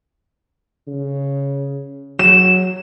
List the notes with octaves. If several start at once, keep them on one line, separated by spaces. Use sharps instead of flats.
C#3
F#3 E7